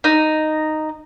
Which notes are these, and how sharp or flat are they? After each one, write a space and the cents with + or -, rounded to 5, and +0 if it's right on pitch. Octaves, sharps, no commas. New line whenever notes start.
D#4 -5